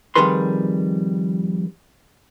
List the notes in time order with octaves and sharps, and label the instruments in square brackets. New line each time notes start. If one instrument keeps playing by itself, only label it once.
[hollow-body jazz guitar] F2 D#3 G3 G#4 B4 C6